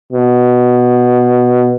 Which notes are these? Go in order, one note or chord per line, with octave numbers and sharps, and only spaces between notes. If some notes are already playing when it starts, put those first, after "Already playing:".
B2